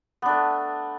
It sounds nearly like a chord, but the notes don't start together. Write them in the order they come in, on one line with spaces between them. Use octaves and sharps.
B3 D4 A3